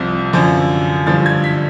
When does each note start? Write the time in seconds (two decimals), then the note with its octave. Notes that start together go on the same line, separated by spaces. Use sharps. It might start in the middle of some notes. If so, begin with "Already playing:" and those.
Already playing: C2 C3 F3
0.33 F#2 D3 F3
1.07 G2 D3 F3 A6
1.26 G#6
1.44 B6